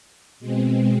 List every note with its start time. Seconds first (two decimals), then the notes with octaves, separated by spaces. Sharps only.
0.40 B2 G#3 C4